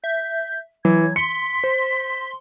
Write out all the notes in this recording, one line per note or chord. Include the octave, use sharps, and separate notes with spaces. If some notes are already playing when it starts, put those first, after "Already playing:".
E5 G6
E3 F#3 G#6
C6 B6 C#7
C5